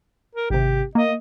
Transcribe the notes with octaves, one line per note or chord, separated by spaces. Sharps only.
A#4
G#1 C3 G4
A#3 D#5